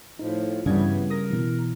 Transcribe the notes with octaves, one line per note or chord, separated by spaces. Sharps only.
A2 F3 D#4
G2 C#3 E3 G3 B3 D4 G#6
A#4 D#6 A#6
B2 E3